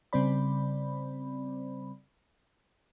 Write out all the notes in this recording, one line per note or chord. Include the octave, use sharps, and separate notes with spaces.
C#3 G3 C4 C5 D5 B5